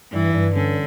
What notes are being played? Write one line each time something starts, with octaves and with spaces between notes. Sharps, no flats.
G2 E3
G2
D3 C#4